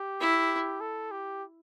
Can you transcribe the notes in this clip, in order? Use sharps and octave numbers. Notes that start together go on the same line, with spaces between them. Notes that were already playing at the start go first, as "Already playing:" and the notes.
Already playing: G4
E4
A4
G4